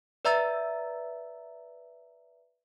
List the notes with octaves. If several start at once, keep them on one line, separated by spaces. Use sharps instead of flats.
B4 D5 E5 A#5 E6 A6